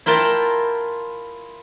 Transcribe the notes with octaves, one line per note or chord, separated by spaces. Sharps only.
E4 F4 A#4 G5 A5